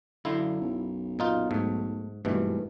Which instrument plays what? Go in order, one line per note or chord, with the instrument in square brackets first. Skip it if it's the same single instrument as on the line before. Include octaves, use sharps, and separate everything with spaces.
[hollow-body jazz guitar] F#2 F5 C6 [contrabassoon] D3 [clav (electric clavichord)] E4
[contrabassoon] B1
[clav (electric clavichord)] A#2 D#4 F4
[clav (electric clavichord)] G#2 [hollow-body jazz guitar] A3
[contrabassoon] G#1 [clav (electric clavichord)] G2 B2 E3 [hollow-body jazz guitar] A3